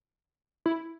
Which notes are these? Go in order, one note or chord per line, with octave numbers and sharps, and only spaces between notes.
E4